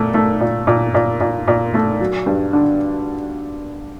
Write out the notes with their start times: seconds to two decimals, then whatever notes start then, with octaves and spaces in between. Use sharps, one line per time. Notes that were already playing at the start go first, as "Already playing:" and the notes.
Already playing: A#2 A3
0.14 A3
0.41 A#2
0.67 A#2
0.94 A#2
1.21 A#2
1.48 A#2
1.74 A3
2.01 F#3
2.26 G2
2.53 D3